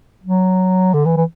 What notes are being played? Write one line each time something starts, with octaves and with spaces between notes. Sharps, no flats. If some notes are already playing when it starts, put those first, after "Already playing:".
F#3
D3
E3
E3